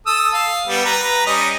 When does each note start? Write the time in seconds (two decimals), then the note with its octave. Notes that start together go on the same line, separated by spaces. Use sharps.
0.07 A4 D#6 E6
0.33 F5
0.68 G3 B3
0.85 B4 A#5
1.26 G3 C#4 D#5